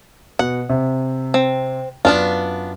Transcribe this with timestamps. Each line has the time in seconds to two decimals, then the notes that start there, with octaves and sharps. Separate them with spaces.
0.39 B2 F#5
0.69 C3
1.34 C4
2.05 F#2 B3 D4 F4 F6